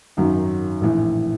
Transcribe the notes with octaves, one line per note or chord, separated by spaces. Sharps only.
G#1 F#2 D#3 F#3
A#1 A2 E3